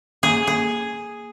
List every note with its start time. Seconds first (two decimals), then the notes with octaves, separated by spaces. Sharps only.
0.23 A#3 G#4
0.47 G#4